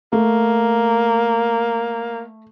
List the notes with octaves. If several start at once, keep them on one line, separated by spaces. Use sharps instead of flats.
A3 A#3